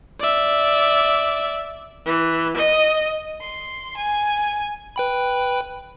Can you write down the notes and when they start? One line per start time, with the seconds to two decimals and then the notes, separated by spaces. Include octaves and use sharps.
0.20 D5 E5
2.04 E3
2.55 D#5
3.40 C6
3.96 G#5
4.96 B4 G5 B5